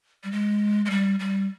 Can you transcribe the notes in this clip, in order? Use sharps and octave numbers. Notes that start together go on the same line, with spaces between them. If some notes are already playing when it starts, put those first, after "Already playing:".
G3
G#3
G#3
G3
G3